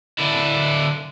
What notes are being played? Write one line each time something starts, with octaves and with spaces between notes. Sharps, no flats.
D3 E4